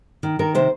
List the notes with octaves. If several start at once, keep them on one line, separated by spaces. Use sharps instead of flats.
D#3
D#3 A#4
C3 C5